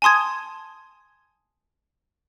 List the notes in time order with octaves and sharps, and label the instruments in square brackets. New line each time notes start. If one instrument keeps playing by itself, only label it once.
[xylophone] G#5 A5 C6 D#6 G#6